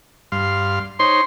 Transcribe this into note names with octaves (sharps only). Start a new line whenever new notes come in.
G2 F5 C6
D#4 C5 C#5 C6